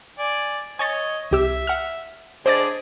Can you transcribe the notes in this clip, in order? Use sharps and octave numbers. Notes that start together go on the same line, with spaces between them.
D5 G#5
C#5 D#5 G#5 C#6 A6
C2 G4 E5 E6
F#5 F6
D3 G#4 C5 D5 D#5 A6